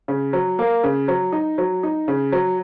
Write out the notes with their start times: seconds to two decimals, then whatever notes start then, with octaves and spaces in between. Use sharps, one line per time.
0.08 C#3
0.33 F#3
0.59 A#3
0.84 C#3
1.08 F#3
1.32 D#4
1.58 F#3
1.83 D#4
2.08 C#3
2.32 F#3